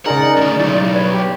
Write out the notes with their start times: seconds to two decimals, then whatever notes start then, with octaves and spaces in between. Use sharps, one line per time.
0.06 C#3 D#4 G#4 A#4 D5 F#5
0.37 D2 G2 D#4
0.60 B1 E4
0.80 G3
0.94 B4 C#5
1.13 G4